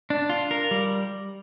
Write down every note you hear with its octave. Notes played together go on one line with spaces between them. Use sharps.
D4
F4
A#4
G3